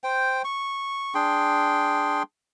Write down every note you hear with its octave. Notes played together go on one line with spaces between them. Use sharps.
C5 G5
C#6
D4 G#4 G5 C6